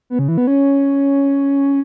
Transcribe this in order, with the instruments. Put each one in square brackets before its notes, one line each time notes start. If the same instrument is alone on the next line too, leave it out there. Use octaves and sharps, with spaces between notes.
[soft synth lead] B3
C#3
E3
B3
C#4